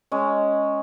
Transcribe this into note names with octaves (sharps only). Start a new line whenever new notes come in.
G#3 C#4